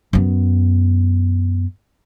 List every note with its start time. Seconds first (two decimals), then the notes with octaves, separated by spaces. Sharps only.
0.13 F#2 B3